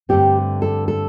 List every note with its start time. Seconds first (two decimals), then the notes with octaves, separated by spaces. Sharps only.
0.09 G2 D3 A3 C4 G4
0.62 A4
0.88 A4